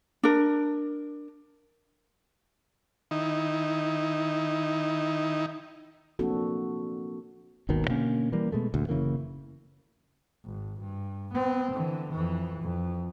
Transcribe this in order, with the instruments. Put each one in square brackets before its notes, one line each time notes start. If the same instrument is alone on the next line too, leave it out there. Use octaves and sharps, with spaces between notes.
[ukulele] D4 A#4
[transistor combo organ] D#3 D#4 E4
[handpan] F3 A#3 C4 D4 F#4 A4
[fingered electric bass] G#1 D#2 B2 D#3
B2 D3 A#3 C#4
E3 G3 A#3
B2 G#3 A3
D2 A#2 D3
F#1 C#3 E3 A#3
[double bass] G#1
G2
B3 C4
D3 E3
F2 E3
F2